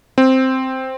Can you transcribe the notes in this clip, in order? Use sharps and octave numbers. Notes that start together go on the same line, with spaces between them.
C4